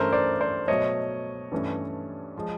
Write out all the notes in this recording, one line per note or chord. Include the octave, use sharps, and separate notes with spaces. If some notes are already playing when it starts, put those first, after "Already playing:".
Already playing: G2 E3 A3 C#4 A#4 C5
C5 D5
C5 D5
B2 F#3 A3 C#5 D#5
G2 E3 A3 C#4
F3 G#3